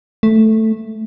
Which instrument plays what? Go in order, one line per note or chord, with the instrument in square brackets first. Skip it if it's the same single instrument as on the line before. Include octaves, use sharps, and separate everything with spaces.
[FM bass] A3